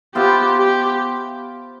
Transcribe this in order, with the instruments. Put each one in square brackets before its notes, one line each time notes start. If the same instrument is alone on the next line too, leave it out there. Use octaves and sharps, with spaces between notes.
[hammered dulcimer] B3 F4 C5 E5 [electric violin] G4
[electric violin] G4